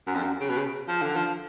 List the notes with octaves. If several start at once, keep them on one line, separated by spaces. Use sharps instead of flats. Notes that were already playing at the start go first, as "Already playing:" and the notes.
F#2
F2
F#2
C#3
B2
C#3
F3
D3
F3